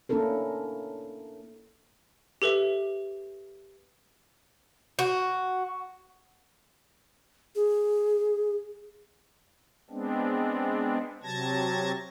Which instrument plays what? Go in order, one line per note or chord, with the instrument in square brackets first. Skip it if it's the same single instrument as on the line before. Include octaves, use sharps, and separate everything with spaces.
[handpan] A#3 C#4 D4 E4 A4 A#4
[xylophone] G4 A4 B4 E5
[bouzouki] F#4
[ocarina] G#4
[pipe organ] G#3 B3 C4 D4
C3 F#3 A5 G#6 A#6